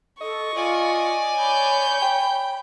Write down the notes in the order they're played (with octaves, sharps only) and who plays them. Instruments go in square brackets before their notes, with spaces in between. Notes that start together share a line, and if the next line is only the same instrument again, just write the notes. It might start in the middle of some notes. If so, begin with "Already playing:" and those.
[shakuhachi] A4 [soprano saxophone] D#5 [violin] C#6
[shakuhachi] F4 [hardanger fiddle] D5 G#5
[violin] C#5 G6 [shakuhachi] B5
[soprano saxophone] G5